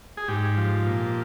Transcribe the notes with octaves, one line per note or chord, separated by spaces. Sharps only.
G#4
G#2 G4
F3
A#2